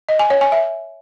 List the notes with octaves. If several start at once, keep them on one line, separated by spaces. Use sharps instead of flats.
D#5
G#5
C#5
G#5
E5